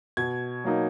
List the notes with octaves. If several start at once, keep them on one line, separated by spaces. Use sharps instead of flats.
B2 G#6
F#3 A#3 D#4